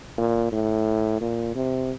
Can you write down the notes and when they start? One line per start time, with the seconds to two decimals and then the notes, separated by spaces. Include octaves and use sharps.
0.18 A#2
0.52 A2
1.21 A#2
1.55 C3